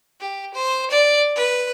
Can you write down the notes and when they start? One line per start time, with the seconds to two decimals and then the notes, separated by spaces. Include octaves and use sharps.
0.20 G4
0.54 C5
0.90 D5
1.36 B4